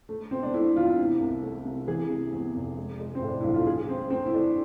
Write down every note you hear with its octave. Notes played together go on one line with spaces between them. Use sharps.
A3
B2 C4
D4
A3 E4
E2 F4
C3 E4
C2
A3
C3
E3 G#4
C3
E2
F1
G#3
G#3
C4
A2
D4
B1 E4
F4
B1 G#4
A3 C4
A3 C4
E4
A3 D4